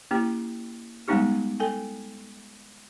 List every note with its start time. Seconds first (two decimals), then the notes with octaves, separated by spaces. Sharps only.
0.11 A#3 C#4 E4 G4 G5
1.08 G3 G#3 B3 C#4 D#4 G4
1.60 A4 G5 G#5